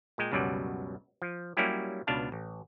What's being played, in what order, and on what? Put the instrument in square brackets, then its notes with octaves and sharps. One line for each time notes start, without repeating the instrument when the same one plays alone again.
[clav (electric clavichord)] A#2 G#3 G5
C#2 F#2 B2 F#3 G3 D5
F3
F#3 G3 A#3 C#4 E4 G4
C#2 B2 B3 D4 F5 A5
A1